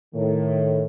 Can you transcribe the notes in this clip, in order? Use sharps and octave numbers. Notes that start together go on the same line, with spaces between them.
A2 D#3